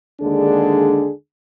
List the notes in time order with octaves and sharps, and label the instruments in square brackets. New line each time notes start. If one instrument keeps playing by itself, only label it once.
[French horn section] D#2 D3 G#3 D4 G#4